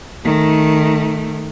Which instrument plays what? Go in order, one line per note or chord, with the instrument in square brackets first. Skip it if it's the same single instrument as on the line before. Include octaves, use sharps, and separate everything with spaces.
[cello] D#3 A3